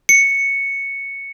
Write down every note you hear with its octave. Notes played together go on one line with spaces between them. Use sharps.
C#7